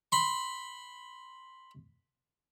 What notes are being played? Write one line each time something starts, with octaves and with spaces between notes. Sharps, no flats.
B5 C6